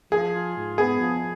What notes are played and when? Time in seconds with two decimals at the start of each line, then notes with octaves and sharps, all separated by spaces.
0.12 F3 G#4
0.34 F4
0.56 G#2
0.78 B3 G#4
0.99 F3